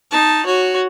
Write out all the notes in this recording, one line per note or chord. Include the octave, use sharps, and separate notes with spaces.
D#4 A5
F#4 C#5